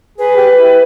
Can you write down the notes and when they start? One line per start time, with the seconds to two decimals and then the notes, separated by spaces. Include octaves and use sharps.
0.18 G#4 B4
0.37 G4
0.57 E4